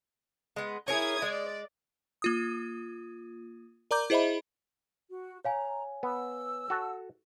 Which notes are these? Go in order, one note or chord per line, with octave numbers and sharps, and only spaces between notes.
G#3 B3
E4 G#4 A#4 C#5 D#6 G#6
G#3 D5
A#3 F4 D#6
A#4 D5 A#5 D6 G6
E4 G#4 C5 D#5 E5 B5
F#4
C#5 F5 G#5 A#5
B3 E6
F#4 A4